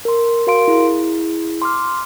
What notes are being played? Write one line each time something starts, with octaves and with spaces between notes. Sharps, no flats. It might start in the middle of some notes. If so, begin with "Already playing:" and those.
A#4 C6
F#4 A#4 F5 C6 D7
E4 G#4
C6 D6 F6